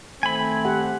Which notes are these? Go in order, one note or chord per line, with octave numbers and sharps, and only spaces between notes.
D#3 A3 C4 G#5 B5
G4 F#5